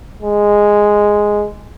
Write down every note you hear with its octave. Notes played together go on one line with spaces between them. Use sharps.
G#3